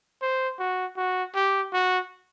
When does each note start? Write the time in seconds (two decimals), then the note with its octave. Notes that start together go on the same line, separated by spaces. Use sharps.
0.22 C5
0.59 F#4
0.97 F#4
1.35 G4
1.73 F#4